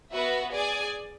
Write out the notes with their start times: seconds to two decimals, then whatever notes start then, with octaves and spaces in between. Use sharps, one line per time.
0.11 B3 F#4 B4 E5
0.52 G#4 D5 G#5